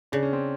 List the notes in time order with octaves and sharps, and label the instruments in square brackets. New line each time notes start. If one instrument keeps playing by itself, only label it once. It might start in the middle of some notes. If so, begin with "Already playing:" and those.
[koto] C#3 [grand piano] D4
[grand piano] C#4
C4